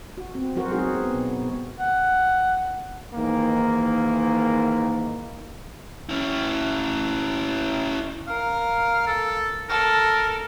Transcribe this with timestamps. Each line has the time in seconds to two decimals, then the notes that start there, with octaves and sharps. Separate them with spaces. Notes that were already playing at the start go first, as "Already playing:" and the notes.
0.17 F#4
0.35 C4
0.56 F#3 F#4 A#4 C5
0.72 G#3 C4 D#4 F#4 G#4
0.95 B3
1.14 B2
1.79 F#5
3.14 G#2 D#3 E3 A#3
6.09 C#4 E4
8.27 A#4 F5
9.07 A4
9.69 A4 A#4